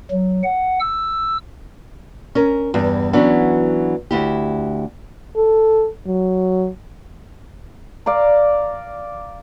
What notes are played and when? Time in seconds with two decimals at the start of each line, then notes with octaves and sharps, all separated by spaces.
0.11 F#3
0.44 F#5
0.80 E6
2.35 C#4 A#4
2.74 E2 G2
3.13 E3 F#3 B3 C#4 D4
4.11 D2 E4 G4
5.36 A4
6.07 F#3
8.06 D5 F5 A#5